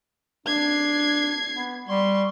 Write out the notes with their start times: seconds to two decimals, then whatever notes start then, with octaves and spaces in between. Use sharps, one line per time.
0.46 D4 G#6 C7
1.55 B3
1.88 G3 C6 C#6